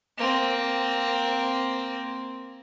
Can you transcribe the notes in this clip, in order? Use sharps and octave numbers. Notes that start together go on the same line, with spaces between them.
A#3 C4